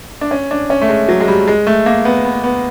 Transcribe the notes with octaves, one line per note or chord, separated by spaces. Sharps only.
D4
C#4
D4
C#4
A3
G#3
F#3
G#3
G3
G#3
A3
A#3
B3
B3
B3